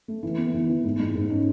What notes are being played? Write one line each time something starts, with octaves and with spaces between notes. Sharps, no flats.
A3
E3
B3
E3
E3
G#2
G#3
G#2
C#4